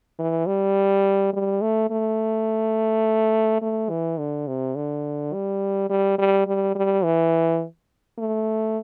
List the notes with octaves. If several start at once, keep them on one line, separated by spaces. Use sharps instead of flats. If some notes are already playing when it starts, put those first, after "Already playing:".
E3
G3
G3
A3
A3
A3
E3
D3
C3
D3
G3
G3
G3
G3
G3
E3
A3